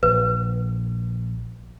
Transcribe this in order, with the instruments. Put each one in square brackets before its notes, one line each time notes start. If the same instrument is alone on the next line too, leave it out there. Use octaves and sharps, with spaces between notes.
[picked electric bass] A#1 [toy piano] B4